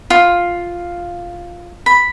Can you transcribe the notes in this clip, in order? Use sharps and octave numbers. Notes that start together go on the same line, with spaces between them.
F4
B5